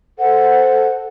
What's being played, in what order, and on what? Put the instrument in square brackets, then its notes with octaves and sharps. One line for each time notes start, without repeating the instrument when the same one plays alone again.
[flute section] A4 C5 F#5